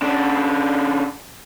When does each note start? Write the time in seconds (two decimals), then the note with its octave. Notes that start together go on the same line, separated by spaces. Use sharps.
0.02 C#3 D4